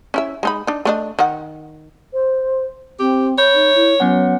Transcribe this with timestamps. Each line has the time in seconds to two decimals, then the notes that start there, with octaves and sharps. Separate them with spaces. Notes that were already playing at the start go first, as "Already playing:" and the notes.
0.14 C#4 E4 E5
0.43 G#3 D#4 B5
0.67 D4 D#4
0.85 A3 D4 D#5
1.19 D#3 F#5
2.13 C5
2.99 C4 G4
3.38 C#5 B5 G6
3.54 D#4
3.75 E4
4.00 F#3 B3 C#4 F#5